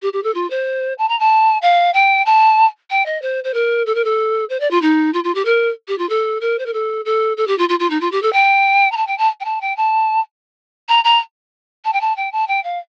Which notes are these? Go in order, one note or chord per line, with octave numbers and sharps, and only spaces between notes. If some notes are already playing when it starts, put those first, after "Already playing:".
G4
G4
A4
F4
C5
A5
A#5
A5
F5
G5
A5
G5
D#5
C5
C5
A#4
A4
A#4
A4
C5
D5
F4
D#4
F4
F4
G4
A#4
G4
F4
A4
A#4
C5
A#4
A4
A4
A4
G4
F4
F4
F4
D#4
F4
G4
A4
G5
A#5
A5
G5
A5
G5
A5
G5
A5
A#5
A#5
A5
G5
A5
G5
A5
G5
F5